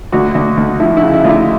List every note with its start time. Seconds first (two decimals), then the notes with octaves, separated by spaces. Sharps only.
0.12 D2 F#4
0.35 D2
0.57 D2
0.80 F3 E4
0.97 C#3 E4
1.13 E4
1.24 D2 F4
1.30 E4